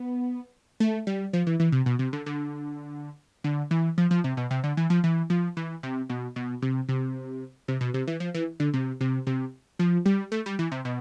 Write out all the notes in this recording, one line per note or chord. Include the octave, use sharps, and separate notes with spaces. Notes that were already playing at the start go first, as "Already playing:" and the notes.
Already playing: B3
A3
G3
F3
E3
E3
C3
B2
C3
D3
D3
D3
E3
F3
F3
C3
B2
C3
D3
E3
F3
E3
F3
E3
C3
B2
B2
C3
C3
C3
B2
C3
E3
F3
E3
D3
C3
C3
C3
F3
G3
A3
G3
E3
C3
B2